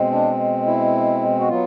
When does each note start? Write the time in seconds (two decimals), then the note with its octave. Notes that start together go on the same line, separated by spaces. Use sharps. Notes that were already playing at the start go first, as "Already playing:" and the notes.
Already playing: B2 G#3 C4
0.12 D4
0.66 E4
1.40 F#4
1.49 F#3 B3 F4